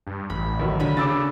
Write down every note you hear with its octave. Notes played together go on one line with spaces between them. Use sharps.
G2
A1 B5
D#2 F#3
D3 B5
C#3 D6 E6 A6